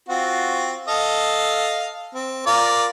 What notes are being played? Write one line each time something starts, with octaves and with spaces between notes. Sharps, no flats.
C4 F4 F#4
A4 D#5 F5
C4
F4 A#4 D5